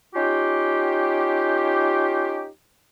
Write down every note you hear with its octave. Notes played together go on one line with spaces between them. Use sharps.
C#4 D#4 F4 G4